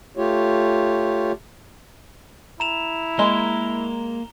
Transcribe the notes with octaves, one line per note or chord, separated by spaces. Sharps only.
A3 F4 G4 C#5
E4 A#5 E7 F7
G#3 A#3 A#4 D#5 G7